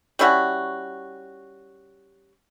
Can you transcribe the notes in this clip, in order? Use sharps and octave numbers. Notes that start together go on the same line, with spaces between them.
G3 C#4 E4 F#4